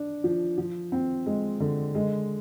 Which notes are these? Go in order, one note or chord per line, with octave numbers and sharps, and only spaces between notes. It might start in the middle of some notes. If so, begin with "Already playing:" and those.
Already playing: D4
F3
F3
C4
G#3
D3
G#3